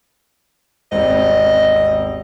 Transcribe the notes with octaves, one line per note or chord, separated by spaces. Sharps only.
D#1 G#1 C4 D#5